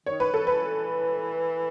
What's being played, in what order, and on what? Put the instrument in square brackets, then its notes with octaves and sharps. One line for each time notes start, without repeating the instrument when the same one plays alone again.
[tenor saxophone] D#3 [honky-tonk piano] C#5
[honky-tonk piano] B4
[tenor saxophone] D#3 [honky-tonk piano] A4
[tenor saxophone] E3 [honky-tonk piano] B4